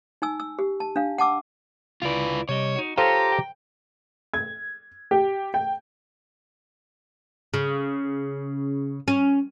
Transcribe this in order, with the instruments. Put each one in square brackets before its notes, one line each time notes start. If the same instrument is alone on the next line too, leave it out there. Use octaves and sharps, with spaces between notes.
[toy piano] D#4 G#5 E6
E6
G4
A5
D4 F5
F#5 A5 D6 E6
[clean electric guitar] C#2 E4 D5 [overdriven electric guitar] F4 B4
[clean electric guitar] C3 G3 D#5 [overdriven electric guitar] C#5
[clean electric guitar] D#4 F#4
[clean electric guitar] F4 C#5 [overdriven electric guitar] G4 [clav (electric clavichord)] A4 C5 F5 [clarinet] A#5
[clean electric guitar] G5
[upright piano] G#6
G4
G5
[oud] C#3
C#4